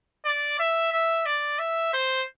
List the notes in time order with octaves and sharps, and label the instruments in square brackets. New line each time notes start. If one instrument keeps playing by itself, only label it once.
[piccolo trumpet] D5
E5
E5
D5
E5
C5